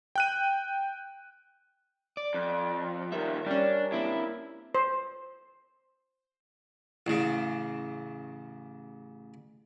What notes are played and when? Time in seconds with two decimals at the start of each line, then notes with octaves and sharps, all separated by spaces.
0.16 G5 F#6 D#7
2.17 D5
2.34 F2
3.12 D#3 G3 A#4 E5
3.46 G3 C#4 D4
3.92 A#3 C4 D4 E4
4.75 C5
7.07 A1 C#3